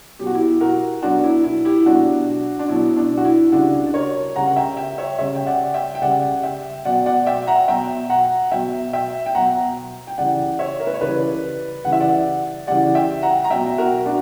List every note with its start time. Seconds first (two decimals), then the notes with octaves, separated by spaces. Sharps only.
0.19 B2 F#3 G4
0.27 F#4
0.34 E4 G4
0.61 F#4 A#4
1.02 B2 F#3 D4 F#4
1.24 E4
1.44 E4
1.65 E4 G4
1.86 B2 F#3 D4 F#4
2.59 D4
2.69 B2 F#3 E4
2.97 D4
3.18 F#4
3.25 E4
3.52 C#3 G3 D4 F#4
3.87 D5
3.94 A#4 C#5
4.36 C#3 G3 F#5 A#5
4.47 F#5
4.56 E5 G5
4.77 E5 G5
4.98 C#5 E5
5.18 C#3 G3 C#5 E5
5.35 G5
5.46 D5 F#5
5.74 E5 G5
5.95 G5
6.02 C#3 G3 D5 F#5
6.43 E5 G5
6.85 B2 F#3 D5 F#5
7.06 D5 F#5
7.26 E5 G5
7.47 F#5 A#5
7.68 B2 F#3 E5 G5
8.10 F#5 A#5
8.51 B2 F#3 E5 G5
8.93 E5 G5
9.26 G5
9.35 B2 F#3 F#5 A#5
10.07 G5
10.18 C#3 E3 G3 D5 F#5
10.59 C#5 E5
10.80 A#4
10.87 B4
10.94 C#5
11.01 C#3 E3 G3 B4 D5
11.84 C#3 E3 G3 F#5
11.93 E5
12.00 D5 F#5
12.67 C#3 E3 G3 D5 F#5
12.95 E5 G5
13.23 F#5 A#5
13.44 A#5
13.50 B2 F#3 E5 G5
13.78 F#4 A#4
14.06 D4 F#4